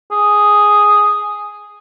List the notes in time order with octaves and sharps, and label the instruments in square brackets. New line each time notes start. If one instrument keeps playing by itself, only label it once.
[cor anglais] G#4